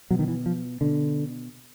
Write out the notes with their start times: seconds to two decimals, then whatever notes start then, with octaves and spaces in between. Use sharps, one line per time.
0.11 B2 F#3
0.19 D#3
0.28 E3
0.46 F3
0.81 B2 D3